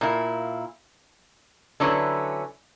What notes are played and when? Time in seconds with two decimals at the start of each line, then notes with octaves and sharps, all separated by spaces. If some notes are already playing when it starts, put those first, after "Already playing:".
0.01 A#2 A#3 E4
1.80 D3 F#3 C#4 E4 B4